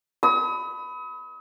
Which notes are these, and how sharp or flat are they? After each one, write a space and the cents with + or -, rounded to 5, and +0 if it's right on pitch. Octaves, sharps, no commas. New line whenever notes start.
B5 +15 D#6 +40